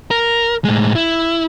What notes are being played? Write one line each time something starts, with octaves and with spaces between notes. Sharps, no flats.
A#4
A2 G#3
E4